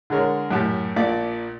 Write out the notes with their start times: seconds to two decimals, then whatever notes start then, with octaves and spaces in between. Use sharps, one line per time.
0.10 D3 G#3 A#4 C#5
0.51 F#2 A2 G4 A5
0.96 A#1 A#2 D5 D6